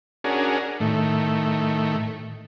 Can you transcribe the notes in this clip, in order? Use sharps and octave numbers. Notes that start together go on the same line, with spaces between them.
C#4 D4 F#4 G#4 A#4
A2 D#3 A3